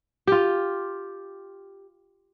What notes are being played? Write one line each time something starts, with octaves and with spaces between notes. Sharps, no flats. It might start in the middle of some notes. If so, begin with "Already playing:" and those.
F4 G4